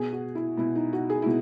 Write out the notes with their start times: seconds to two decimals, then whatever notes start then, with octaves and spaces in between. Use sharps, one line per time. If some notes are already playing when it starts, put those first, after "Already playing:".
Already playing: B2 G#4
0.12 F#4
0.35 E4
0.58 B2 E4
0.75 D#4
0.93 F#4
1.10 G#4
1.22 E4
1.26 B2